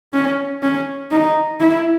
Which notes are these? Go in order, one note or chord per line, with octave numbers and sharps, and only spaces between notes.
C#4
C#4
D#4
E4